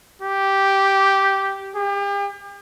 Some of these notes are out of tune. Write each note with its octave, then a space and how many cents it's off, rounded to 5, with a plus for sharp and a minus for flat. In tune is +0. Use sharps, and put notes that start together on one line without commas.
G4 -5
G4 +40